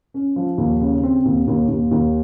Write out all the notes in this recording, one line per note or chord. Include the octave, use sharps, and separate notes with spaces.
C#4
F3
D#2
C#3
C4
D#2
D#2
D#2
D#2